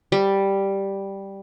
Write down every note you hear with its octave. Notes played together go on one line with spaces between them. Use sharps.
G3